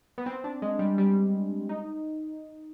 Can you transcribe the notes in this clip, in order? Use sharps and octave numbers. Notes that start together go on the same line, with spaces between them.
B3
C4
D4
G#3
G3
G3
D#4